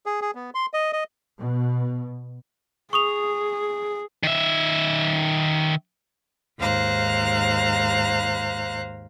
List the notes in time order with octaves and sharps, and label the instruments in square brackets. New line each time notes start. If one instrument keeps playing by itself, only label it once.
[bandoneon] G#4
G#4
B3
C6
D#5
D#5
[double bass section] B2
[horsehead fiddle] G#4 [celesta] C#6 D#6 F7
[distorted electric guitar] D#3 E5
[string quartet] D#2 G#2 C5 F5 A#5 F#6